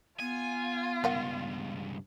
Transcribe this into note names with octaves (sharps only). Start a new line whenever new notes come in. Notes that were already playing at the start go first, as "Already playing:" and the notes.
B3 F4 G#5
C#2 G2 D#3 F5 F#5